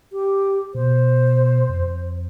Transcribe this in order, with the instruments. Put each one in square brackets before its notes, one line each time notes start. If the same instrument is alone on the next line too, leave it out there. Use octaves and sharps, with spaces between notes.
[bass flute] G4
[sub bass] B2 [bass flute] C5
[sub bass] F2